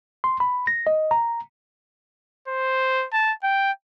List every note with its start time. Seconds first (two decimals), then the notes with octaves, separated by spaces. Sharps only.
0.24 C6
0.40 B5
0.67 A#6
0.87 D#5
1.11 A#5
2.48 C5
3.13 A5
3.43 G5